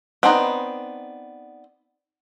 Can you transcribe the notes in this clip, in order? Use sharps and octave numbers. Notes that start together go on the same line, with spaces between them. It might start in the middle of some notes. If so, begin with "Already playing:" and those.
B3 C4 D4 D#4